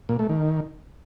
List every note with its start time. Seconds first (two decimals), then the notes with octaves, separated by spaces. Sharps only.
0.09 A#2
0.19 A3
0.29 D#3